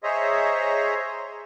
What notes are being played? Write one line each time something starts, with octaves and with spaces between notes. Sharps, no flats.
G#4 C5 C#5 D#5 E5 A#5